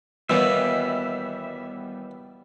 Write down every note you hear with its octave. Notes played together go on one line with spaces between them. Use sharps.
D#2 B2 E3 G3 B3 E5